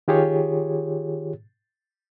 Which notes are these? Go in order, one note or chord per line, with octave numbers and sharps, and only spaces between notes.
D#3 F4 G4 G#4 C#5